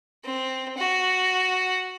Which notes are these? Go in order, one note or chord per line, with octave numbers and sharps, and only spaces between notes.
C4
F#4